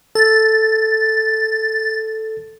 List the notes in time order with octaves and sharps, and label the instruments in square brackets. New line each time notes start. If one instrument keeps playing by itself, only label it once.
[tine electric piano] A4 [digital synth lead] A6